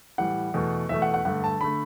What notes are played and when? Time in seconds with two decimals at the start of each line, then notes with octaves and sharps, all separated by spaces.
0.18 A2 E3 G3 F#5
0.54 E2 B2 A3
0.89 E2 B2 A3 E5
1.02 F#5
1.14 F#5
1.25 G2 D3 A3 F#5
1.44 A5
1.61 D3 A3 B5